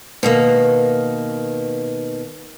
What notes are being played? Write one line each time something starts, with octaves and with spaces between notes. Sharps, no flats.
B2 D#3 A#3